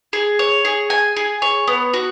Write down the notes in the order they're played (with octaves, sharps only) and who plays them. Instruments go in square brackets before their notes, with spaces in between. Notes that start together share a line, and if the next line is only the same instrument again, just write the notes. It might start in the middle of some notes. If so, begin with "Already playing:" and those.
[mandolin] G#4
C#5
G#4
G#5
G#4
C#5
B3
F#4